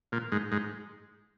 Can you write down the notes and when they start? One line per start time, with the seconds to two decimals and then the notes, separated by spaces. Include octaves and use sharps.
0.12 A#2
0.32 G#2
0.52 G#2